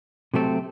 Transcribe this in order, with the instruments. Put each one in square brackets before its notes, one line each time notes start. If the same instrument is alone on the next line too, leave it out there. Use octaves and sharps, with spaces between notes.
[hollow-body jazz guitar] C3 F#3 A3 C4